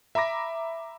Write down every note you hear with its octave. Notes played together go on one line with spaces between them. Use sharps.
E5 A#5 B5 D6 A#6